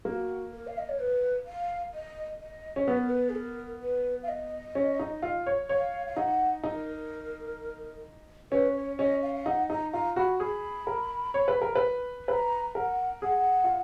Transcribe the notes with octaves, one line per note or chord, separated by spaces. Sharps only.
A#3 F#4
A#4
F5
D#5
C#5
B4
F5
D#5
D#5
C#4
B3 B4
A#4
B4
G#4
A#4
B4
F5
D#5
C#4
D#4
F4
C#5
C#5 F5
F5
D#4 F#5
D#4 A#4
C#4 B4
C#5
C#4 D#5
F5
F5
D#4 F#5
D#4 A#5
F4 A#5
F#4 B5
G#4 B5
A#4
C#5
B4
A#4
B4
B4 A#5
A#4 F#5
G#4 F#5
F4